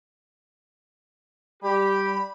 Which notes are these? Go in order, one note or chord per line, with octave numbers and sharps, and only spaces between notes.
G3 G4 B5